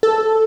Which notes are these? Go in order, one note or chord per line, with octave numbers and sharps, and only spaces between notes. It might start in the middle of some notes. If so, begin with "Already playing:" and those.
A4